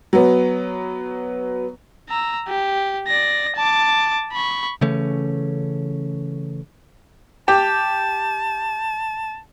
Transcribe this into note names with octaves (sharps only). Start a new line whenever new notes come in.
F#3 B3
A#5 E6
G4
D5 A#6
A5 D6
B5 C#6
C#3 E3 A3 C#4
G4 A5